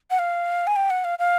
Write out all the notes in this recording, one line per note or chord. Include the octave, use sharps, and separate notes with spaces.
F#5
F5
G#5
G5
F#5
F5
F5